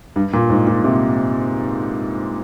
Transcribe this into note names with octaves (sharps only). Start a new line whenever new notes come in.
G2
A#2
G#2
A#2
C3